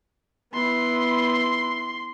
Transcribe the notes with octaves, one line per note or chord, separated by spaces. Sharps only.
B3 E4 C6